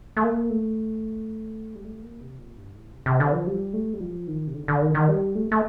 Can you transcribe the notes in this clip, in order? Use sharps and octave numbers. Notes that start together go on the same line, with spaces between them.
A3
A#3
A3
G3
A3
A#3
C3
A#2
G2
A2
C3
C3
D3
F3
G3
A3
G3
F3
D#3
C3
D3
D3
D#3
D#3
G3
A3
A3